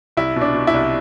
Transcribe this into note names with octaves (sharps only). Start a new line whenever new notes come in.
C2 E4
B2
D4
B2
E4
C2